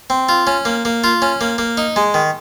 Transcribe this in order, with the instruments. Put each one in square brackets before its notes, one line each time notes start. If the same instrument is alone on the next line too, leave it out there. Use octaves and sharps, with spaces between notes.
[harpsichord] C4
F4
C#4
A#3
A#3
F4
C#4
A#3
A#3
D#4
G#3
D#3